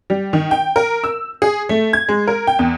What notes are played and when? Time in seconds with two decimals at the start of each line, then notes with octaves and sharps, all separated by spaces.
0.10 G3
0.33 D#3
0.51 G5
0.76 A#4
1.04 E6
1.42 G#4
1.69 A3
1.93 G#6
2.09 G#3
2.28 A#4
2.47 G5
2.59 E2